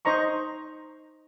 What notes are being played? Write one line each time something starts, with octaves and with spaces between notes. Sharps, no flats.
D#4 C5 D#5 A#5 C#6